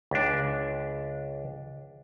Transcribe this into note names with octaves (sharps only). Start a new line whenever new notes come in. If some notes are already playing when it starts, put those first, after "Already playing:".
C#2 D4